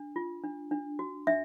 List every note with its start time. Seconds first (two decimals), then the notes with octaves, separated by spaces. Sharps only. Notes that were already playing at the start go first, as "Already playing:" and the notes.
Already playing: D4
0.16 F4
0.44 D4
0.71 D4
0.99 F#4
1.27 D4 E5